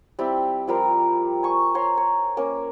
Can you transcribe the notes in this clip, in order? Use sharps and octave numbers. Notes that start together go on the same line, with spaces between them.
G3 C4 E4
F3 G3 A#4 C6
G#5 C#6
C5 C#5 A#5 C6
C#5
A#3 C#4